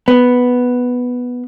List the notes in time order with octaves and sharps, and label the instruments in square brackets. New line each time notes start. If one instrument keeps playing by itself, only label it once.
[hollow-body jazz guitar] B3